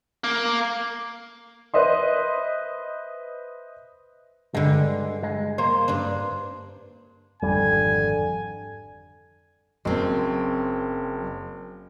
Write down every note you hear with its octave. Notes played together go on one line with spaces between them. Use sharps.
A#3
B4 C5 D#5 E5 C6
G2 D3 G#3
G#3
A#3 C5
G2 D4
G#1 F2 D3 G3 G#5
F#1 F#3 C4